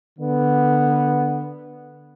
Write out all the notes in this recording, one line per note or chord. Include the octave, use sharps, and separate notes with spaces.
D3 B3